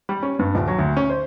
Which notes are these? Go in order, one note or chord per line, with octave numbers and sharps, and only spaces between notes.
G3
C#4
G2
D#1
F#3
D2
C#4
C5